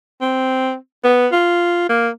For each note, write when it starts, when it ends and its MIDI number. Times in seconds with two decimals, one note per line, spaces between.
0.21 0.75 60
1.04 1.27 59
1.32 1.86 65
1.89 2.09 58